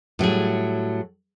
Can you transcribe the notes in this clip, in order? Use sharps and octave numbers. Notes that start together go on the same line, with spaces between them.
A2 F#3 G3 G#4